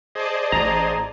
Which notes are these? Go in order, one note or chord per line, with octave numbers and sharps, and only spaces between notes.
G#4 C5 D5 D#5 A5
A1 A#5